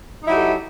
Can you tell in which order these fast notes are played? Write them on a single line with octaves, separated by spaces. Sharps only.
D#4 E4 F#3 G4 A4